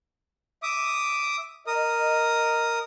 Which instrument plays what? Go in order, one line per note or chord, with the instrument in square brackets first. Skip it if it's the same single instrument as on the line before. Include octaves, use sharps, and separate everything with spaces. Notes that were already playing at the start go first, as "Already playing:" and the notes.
[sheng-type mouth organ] E5 D6 D#6
[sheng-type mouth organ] A#4 D#6 [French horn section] D#5